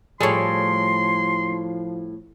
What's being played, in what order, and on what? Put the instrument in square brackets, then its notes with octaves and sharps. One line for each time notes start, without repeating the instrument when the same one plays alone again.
[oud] A2 G3 [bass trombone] F3 [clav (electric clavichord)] G#4 A4 C#5 [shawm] C6